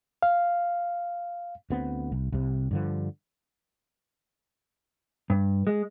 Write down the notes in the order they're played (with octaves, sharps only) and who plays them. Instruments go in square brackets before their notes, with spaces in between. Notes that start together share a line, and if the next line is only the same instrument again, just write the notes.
[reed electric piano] F5
[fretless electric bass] D2 B3 C4
C2
C2 C3
G2 D3 F3
[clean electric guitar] G2
G#3